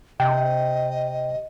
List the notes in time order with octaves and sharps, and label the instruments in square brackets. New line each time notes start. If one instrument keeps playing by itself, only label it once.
[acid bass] C3 [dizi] D#5 [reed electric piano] G5